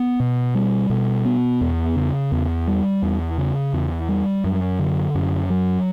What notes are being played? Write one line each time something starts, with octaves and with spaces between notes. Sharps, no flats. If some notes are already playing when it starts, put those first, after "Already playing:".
Already playing: B3
B2
G3
B2
B3
E2
C#3
E2
G3
E2
C#3
E2
G3
F#2
D3
F#2
F#3